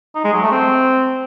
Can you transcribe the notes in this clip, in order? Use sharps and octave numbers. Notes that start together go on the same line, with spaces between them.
D#4
G#3
F#3
A3
C4